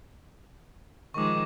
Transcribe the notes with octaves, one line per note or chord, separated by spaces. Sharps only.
D#3 F3 G#3 C#6 D6